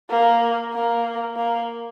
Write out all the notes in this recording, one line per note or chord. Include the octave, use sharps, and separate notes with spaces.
A#3
A#3
A#3